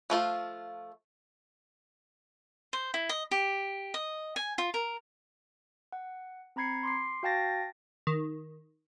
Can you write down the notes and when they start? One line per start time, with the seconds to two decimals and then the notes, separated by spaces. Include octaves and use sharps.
0.10 F3 A3 F4
2.73 C5
2.94 E4
3.09 D#5
3.31 G4
3.94 D#5
4.36 G#5
4.58 F4
4.74 A#4
5.92 F#5
6.56 C4 A#5 B5 G#6 C7 C#7
6.83 C6 D6 C7
7.23 F#4 F5 G5 A5 A6 A#6
8.07 D#3